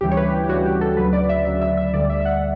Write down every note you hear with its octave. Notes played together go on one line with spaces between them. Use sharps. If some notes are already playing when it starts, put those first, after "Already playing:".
D2 C#3 E3 G3 G4
C#5
B4
G4
G4
D2 C#3 E3 G3 F#4
G4
A4
D2 C#3 F#3 B4
D5
E5
D2 C#3 F#3 E5
E5
E5
D2 D3 G3 D5
E5
E5
F#5